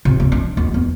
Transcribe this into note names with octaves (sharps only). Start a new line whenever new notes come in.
C3
A#3
D4
D#2
E2